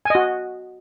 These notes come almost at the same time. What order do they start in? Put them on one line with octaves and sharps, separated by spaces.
G#5 D#5 F#4